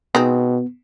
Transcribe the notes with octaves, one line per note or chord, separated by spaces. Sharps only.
B2 G#3 B3 C4 D#4